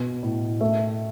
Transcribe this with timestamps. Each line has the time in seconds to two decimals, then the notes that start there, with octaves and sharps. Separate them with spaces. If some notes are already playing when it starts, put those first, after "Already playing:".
Already playing: B2 B3
0.23 A2
0.61 A3 E5